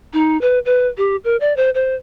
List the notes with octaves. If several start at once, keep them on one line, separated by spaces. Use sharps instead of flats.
D#4
B4
B4
G4
A#4
D5
C5
C5